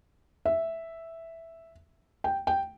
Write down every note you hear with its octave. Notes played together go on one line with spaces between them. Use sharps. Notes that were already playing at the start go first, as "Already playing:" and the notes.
E5
G5
G5